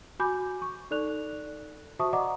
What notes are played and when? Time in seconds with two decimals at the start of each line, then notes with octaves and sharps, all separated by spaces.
0.20 F#4 G#5 B5 D6 G6
0.62 C#6
0.91 D#4 A4 D5 F#6 F7
1.99 F#4 C5 E5 A5 C#6 D#6
2.13 D5 D#5 F#5 A#5 D6